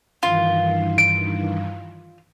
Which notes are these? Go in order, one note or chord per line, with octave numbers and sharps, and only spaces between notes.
G2 D#3 E3 F4
D7